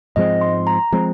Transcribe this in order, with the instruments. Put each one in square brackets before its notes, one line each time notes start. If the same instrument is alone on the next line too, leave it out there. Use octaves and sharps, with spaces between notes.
[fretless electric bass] G#2 F3 G#3 C4 [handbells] D#5
[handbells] C6
A#5
[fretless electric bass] F3 G#3 C4